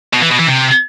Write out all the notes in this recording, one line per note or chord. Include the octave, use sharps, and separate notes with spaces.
B2
E3
B2
E3
C3